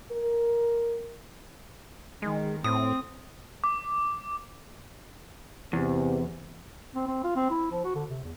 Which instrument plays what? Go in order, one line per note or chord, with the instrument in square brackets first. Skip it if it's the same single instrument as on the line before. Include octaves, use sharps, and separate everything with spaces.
[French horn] A#4
[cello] D#3 [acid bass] G#3
[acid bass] A2 [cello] C4 [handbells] D#6
[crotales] D6
[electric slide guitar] E2 [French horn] C3
[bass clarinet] C4
C4
F4
C4
E4
F3
F#4
D3
C3
E2